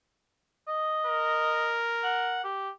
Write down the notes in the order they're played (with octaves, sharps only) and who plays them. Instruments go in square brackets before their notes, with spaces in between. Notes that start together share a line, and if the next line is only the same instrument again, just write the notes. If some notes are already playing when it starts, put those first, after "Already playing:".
[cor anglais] D#5
[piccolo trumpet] A#4
[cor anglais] F#5
G4